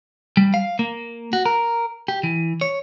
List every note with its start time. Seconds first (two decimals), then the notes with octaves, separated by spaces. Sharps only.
0.37 G3
0.54 F5
0.79 A#3
1.33 F#4
1.46 A#4
2.08 G4
2.23 E3
2.61 C#5